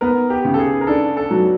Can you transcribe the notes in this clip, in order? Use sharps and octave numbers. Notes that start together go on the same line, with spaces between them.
B3 A#4
G4
C#3
A4
G#4
A#4
D4 A4
A4
F#3